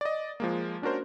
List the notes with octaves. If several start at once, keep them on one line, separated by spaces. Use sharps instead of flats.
D5 D#5
F3 G#3 A#3
C#4 D4 F#4 A#4 C5